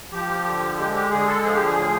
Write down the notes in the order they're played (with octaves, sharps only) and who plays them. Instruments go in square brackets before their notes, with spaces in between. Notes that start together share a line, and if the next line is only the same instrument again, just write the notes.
[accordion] F3 G4
D3
G#3 G4
G4
D3 G#4
A4
F3 G#4
G4
G#4
A2